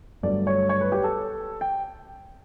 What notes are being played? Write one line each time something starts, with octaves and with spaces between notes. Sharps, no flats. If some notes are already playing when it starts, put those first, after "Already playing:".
G1 G2 F#3 A3 D5
C#5
C#5
B4
G4
A4
G5